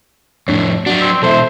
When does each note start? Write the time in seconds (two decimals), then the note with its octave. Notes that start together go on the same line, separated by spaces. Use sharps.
0.48 F2 A2 D4 C#5
0.86 F#3 D4 F#4
1.01 C4 E6
1.23 B2 E3 A4 C5 E5